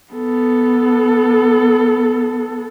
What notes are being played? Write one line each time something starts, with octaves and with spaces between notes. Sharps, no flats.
B3 A4